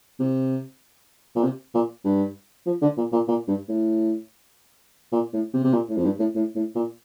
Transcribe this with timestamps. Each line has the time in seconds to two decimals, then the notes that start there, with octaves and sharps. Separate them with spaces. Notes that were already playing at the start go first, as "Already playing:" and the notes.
0.20 C3
1.35 A#2
1.43 C3
1.74 A#2
2.04 G2
2.66 F3
2.82 D3
2.97 A#2
3.12 A#2
3.28 A#2
3.48 G2
3.68 A2
5.12 A#2
5.33 A2
5.53 C3
5.64 C3
5.73 A#2
5.89 A2
5.97 F2
6.05 G2
6.19 A2
6.35 A2
6.55 A2
6.75 A#2